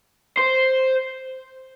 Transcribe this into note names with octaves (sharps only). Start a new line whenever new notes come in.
C5